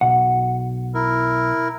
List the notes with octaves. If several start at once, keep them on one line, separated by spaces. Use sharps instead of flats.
B1 F#5
E4 A#4